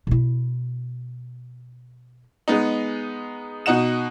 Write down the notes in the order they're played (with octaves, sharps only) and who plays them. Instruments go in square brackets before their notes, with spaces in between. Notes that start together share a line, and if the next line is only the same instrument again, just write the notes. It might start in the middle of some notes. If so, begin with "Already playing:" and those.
[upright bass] B2 E4
[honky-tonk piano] G#3 B3 D#4
B2 D#4 F#5 E7